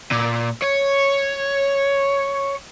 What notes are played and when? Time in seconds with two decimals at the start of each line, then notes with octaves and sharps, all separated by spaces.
0.12 A#2
0.64 C#5